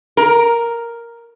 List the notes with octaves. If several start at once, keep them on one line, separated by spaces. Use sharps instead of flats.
A#4